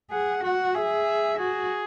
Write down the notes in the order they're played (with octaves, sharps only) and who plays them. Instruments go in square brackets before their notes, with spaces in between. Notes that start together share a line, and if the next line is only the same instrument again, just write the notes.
[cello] G#4 [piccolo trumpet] F#5
[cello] F#4 [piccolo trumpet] F#5
[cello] G#4 [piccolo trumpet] E5
[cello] F#4 [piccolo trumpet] G#4